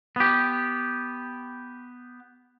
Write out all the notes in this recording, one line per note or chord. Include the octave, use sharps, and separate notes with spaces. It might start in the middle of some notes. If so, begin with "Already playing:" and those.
B3 G4